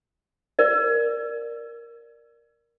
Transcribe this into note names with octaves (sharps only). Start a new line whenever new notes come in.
A#4 D5